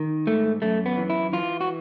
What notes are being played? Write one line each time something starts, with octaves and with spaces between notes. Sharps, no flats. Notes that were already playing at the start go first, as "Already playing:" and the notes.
Already playing: D#3
G#2 A3
F#2 A3
B3
E3
E4
E3 F4
F#4